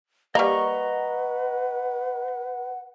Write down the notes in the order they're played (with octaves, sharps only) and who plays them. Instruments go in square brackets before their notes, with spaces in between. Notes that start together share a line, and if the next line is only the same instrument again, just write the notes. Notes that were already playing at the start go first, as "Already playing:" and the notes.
[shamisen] G3 A#3 [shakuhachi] B4 [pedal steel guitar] D#5 A#5 C#6 [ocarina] F#5